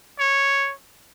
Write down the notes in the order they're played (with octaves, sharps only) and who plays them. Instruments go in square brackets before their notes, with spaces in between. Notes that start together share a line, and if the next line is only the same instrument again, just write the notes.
[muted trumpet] C#5